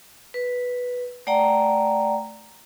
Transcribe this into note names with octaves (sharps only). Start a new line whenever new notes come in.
B4
A3 D5 F#5 G5 A#5